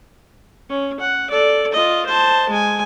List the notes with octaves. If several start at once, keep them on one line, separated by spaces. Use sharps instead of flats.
C#4
F#5
A4 D5
F4 D#5
C5 A5
G#3 G#5